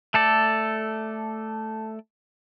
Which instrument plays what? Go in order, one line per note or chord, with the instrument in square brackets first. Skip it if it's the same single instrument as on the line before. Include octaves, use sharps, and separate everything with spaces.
[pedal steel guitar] A3 A4 D5